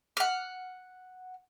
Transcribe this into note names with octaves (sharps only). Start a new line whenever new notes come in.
F#5 F6